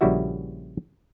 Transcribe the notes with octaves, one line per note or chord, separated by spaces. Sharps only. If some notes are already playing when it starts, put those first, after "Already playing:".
A#1 C#3 G3 E4 F#4 E5